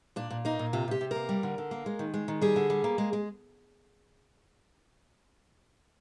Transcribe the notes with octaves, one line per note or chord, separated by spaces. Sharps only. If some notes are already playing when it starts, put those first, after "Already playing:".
A#2 D4
A#2
A#3 D#4
A#2
C3 F4
C3 G4
C3
A#3 A#4
G3
D3
D3
A#3
G#3
D#3
G#3
D#3
G3 G#4
D3
G3
A#3
G#3
G#3